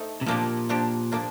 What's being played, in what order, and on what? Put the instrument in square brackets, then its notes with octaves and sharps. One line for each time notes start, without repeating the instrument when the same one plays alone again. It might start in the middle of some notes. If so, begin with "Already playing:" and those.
Already playing: [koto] A3 D#4 A4 C5
[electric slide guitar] C3
[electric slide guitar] A#2 [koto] F3 A#3 D4 G4
[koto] F3 A#3 D4 G4
F3 A#3 D4